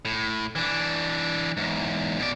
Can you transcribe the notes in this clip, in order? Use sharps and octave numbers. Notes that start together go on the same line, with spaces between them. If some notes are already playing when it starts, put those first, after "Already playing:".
A2
E3 D4
E2 G#2
B2 D5